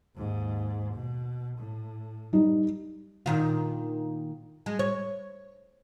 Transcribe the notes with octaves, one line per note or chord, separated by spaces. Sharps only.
D#2 G#2
B2
A2
G3 D#4
A#2 D#3 F4
G#3
C#5